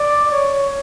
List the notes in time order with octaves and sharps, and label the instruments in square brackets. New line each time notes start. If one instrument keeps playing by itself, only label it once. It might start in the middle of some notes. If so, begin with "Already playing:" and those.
Already playing: [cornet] D5
C#5